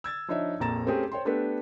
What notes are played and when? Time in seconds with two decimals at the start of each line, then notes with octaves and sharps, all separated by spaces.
0.04 E6 G#6 A6
0.28 F3 D4 D#4 C#5 E5
0.60 A#1 F2 A#3 A#5 A6 E7
0.87 A3 C4 C#4 G4 G#4 A#4
1.11 C5 C#5 G5 C6
1.25 A3 B3 D4 G4 A4 B4